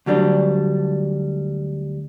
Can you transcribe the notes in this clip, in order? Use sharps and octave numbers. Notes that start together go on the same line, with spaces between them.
D2 F#3 G3 D4